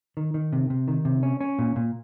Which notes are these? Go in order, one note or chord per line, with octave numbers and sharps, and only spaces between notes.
D#3
D#3
C3
C3
D#3
C3
C#4
C#4
A#2
A#2